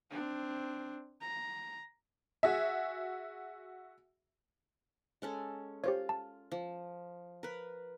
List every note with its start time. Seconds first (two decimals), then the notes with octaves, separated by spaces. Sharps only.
0.10 C4 D4
1.21 A#5
2.43 F#4 G#4 E5
5.22 G#3 C#4 A4
5.84 F4 G4 C5 C#5
6.09 A5
6.52 F3
7.43 A#4 B4